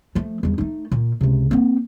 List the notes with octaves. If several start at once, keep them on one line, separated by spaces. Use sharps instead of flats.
F3 A3
E2 G3
A3 D#4
A#2
C#2 C3
A#3 C4